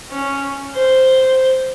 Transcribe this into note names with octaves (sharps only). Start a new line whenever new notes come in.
C#4
C5